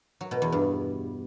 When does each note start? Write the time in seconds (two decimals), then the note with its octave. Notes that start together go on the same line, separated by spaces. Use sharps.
0.21 F#3
0.31 B2
0.42 E2
0.52 G2